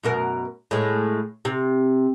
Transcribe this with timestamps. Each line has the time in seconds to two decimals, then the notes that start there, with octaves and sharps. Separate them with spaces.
0.03 F#2 B2 A#4
0.71 A2 G#3
1.45 C3